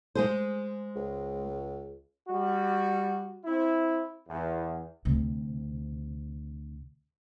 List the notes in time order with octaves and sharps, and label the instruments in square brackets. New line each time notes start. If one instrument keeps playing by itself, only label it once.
[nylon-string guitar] G#3 G#4 C5
[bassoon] C#2
[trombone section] G3 F#4
C4 E4
E2
[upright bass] D2 C3